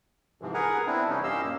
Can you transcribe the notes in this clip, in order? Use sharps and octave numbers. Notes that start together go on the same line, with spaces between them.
G#2 C3 E3 F3
G#4 A#4 B4 F#5 G#5 A#5
B3 C4 D4 E4
C3 E3 G3 C#4 D#4
F#2 C#4 G4 D#5 F5 E6
A#2 A#3